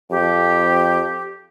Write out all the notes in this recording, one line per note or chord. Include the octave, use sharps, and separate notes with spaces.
F2 G4